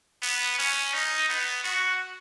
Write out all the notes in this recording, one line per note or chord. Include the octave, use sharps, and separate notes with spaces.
B3
C#4
D#4
B3
F#4